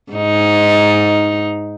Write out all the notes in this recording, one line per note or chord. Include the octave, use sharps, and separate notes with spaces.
G#2 D#4